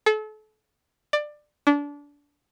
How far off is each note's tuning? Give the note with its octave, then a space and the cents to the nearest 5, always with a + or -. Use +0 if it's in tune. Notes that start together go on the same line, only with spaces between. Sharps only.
A4 -35
D5 +20
D4 -25